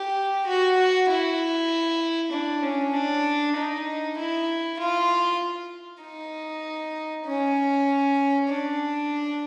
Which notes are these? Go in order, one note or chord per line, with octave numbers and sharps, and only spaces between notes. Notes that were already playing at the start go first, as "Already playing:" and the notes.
Already playing: G4
F#4
F#4
E4
D4
C#4
D4
D#4
E4
F4
D#4
C#4
D4